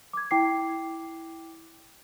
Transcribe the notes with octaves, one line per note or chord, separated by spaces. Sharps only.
D6 G#6
E4 G5 D6 C7